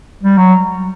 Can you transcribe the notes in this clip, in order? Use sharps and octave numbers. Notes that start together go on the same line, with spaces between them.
G3
F#3